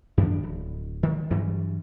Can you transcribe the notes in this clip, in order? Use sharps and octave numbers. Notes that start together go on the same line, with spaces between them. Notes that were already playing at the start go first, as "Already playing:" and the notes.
F#2 D#3 F3 D4
D1
D#3
G2 E3 F#3 G3